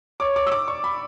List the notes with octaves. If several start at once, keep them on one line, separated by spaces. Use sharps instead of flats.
C#5 D6
D6
E6
D6
D5 C#6
B5